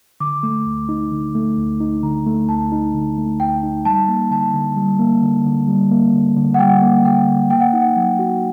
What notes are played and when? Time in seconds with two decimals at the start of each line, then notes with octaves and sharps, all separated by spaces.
0.20 D3 D6
0.43 A3
0.66 D2
0.89 D#4
1.12 D3
1.35 A3
1.58 D2
1.81 D#4
2.03 D3 A#5
2.26 A3
2.48 D2 A5
2.72 D#4
2.94 D3
3.18 A3
3.40 D2 G5
3.63 D#4
3.85 G3 A5
4.08 A#3
4.31 D3 A5
4.54 D3
4.76 G3
4.99 A#3
5.22 D3
5.45 D3
5.68 G3
5.91 A#3
6.14 D3
6.37 D3
6.54 F#5
6.59 G3 G5
6.82 A#3
7.05 D3 G5
7.27 D3
7.50 A#3 G5
7.61 F#5
7.73 D#4
7.81 F#5
7.96 F#3
8.19 F#4